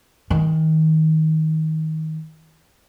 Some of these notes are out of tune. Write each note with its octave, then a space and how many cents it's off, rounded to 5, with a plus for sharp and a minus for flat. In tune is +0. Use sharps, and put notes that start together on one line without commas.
D#3 +25